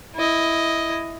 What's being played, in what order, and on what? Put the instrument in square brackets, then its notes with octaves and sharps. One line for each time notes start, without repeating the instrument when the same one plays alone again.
[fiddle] E4 D#5